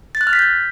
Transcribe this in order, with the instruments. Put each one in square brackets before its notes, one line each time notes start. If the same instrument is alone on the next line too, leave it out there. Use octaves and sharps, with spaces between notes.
[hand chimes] A6
F#6
F6
B6
G6